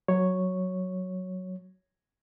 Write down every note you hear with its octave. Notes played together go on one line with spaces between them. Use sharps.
F#3 C#5